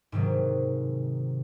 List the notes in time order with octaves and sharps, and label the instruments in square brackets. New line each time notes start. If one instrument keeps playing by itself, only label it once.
[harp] G#2 C3 D#3 F#3